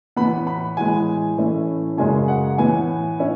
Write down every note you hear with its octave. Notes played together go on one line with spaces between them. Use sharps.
A2 E3 B3 B5
B5
A2 E3 G#3 G#5
A2 E3 A3 C#4
F#2 C#3 G#3 C#4 G#5
F#5
A2 E3 B3 G#5
C#4 E4